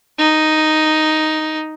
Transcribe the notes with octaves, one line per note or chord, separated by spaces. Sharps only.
D#4